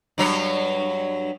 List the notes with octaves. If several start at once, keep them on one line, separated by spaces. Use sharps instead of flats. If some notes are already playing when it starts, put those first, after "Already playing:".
G2 F#3 C#5